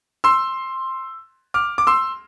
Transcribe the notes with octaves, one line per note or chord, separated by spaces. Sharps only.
C6 E6
D6 F6
D6
C6 E6